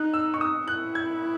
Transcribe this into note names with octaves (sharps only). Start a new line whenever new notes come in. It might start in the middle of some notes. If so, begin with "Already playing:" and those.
Already playing: D#4 F#6
E6
C#6
D#6
E4 F#6
G#6